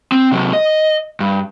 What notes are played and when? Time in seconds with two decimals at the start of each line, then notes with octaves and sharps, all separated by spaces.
0.12 C4
0.32 C3 F#3
0.53 D#5
1.20 G2